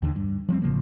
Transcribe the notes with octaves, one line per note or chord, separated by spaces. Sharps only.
D#2 D3 D#3
G2
F3 G3 A3 C4
A1 C#3 F3 A#3